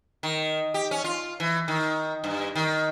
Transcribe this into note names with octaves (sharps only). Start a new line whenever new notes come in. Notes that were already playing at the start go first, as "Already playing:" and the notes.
D#3
G4
C#4
F4
E3
D#3
G2
D#3